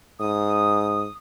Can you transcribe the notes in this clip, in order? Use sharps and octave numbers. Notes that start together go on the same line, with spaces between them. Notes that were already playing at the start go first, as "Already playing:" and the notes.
G#2 D#6